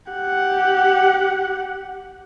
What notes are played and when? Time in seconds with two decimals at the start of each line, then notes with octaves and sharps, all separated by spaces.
0.12 G4 F#5